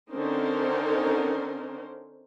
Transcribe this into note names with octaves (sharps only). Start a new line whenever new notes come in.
D3 C4 C#4 D#4 A#4 C5